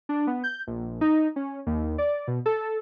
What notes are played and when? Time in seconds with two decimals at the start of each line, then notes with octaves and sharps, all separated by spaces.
0.09 D4
0.27 B3
0.44 G6
0.67 A#1
1.01 D#4
1.36 C#4
1.67 D#2
1.98 D5
2.28 B2
2.46 A4